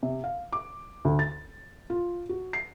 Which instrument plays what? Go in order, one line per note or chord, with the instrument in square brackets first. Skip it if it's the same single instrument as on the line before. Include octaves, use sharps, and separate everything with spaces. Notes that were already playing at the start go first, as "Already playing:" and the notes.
[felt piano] C3
F5
D6
D2
A6
F4
F#4
C7